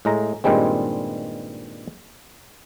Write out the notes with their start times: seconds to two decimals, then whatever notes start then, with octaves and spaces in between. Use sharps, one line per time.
0.05 A2 G#3 A#5
0.44 G2 A#2 D#3 G3 G#3 C4